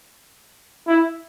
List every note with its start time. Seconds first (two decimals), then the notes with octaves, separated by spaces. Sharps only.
0.87 E4